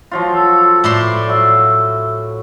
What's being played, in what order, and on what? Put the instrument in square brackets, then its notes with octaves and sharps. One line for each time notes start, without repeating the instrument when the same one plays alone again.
[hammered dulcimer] F3 F#3 F4
[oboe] A4
[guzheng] A2 E4 C6 [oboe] D5
[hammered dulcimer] F#3 [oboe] E5